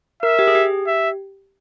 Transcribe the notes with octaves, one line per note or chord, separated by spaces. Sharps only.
A#4 E5
G4
G#4
G4
E5